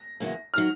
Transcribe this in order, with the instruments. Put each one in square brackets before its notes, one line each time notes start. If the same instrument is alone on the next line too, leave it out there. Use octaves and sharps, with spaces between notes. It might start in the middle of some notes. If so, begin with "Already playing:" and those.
Already playing: [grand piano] A#6
[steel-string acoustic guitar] E2 C#3 F#3 A#3
[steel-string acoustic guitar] D#3 F#3 [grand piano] F6